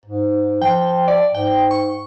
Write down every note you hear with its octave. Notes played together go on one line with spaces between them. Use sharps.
G#2
F3 G5
D5
G#2 G5
C#6